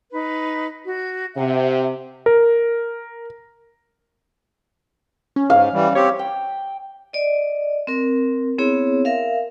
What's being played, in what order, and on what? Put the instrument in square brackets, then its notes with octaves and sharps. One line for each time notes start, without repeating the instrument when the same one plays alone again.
[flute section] D#4 B4
F#4
[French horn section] C3 [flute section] E5 F#5
[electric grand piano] A#4
[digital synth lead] C#4
[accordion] G#2 [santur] F5
[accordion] E3 G3
[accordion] C4 G4 [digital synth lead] C#5
[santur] G5
[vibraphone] D5 D#5
C4 A#4
B3 C4 E4 G#4 C#5
A#4 E5 F5